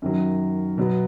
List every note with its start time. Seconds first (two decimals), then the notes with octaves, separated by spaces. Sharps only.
0.02 F#2 D#3 F#3
0.78 B2 F#3 B3